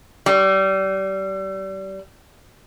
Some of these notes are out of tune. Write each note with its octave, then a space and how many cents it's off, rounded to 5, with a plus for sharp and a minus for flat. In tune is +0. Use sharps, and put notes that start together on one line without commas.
G3 -30